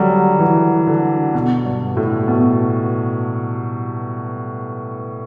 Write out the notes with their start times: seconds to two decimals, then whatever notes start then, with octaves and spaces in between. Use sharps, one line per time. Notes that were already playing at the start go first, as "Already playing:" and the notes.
Already playing: D3 F#3 G3
0.39 E3
0.87 D3
1.34 B2
1.65 G2
1.97 A2
2.28 B2